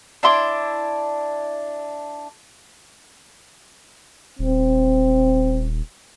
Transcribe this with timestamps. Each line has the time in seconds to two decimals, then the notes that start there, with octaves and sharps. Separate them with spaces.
0.23 D4 E4 C6 D6
4.39 D#1 C4